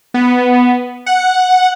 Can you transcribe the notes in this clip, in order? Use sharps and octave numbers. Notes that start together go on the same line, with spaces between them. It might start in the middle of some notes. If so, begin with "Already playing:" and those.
B3
F#5